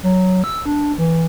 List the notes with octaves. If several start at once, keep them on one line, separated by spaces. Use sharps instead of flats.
F#3
E6
D4
E3